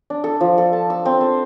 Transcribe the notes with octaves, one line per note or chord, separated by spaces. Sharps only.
D4
A4
F3
A4
A5
E6
C4
C5